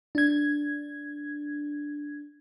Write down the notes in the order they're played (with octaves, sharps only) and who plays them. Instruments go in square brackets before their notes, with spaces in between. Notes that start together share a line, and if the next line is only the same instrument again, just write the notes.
[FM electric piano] D4 G#6